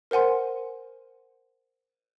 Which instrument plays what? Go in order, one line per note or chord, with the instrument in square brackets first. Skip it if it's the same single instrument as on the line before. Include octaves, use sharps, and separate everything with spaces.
[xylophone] A#4 C5 F#5 G#5 C6